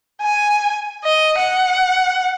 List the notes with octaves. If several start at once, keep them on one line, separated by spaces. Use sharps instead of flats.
G#5
D#5
F#5